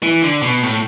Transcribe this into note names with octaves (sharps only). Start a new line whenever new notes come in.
E3
D3
B2
A2